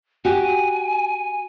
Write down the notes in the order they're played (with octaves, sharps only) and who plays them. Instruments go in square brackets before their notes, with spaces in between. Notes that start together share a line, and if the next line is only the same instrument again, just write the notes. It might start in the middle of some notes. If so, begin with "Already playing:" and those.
[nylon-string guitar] F#4 G4 [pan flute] G#5